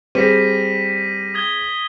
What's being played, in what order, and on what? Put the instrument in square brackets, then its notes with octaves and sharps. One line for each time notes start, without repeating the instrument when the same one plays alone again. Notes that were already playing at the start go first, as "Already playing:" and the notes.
[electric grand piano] G3 [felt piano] C4 G#4 [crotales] A#6 B6 D#7
[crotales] D#6 G#6 G7